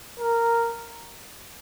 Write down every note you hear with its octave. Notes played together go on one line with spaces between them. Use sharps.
A#4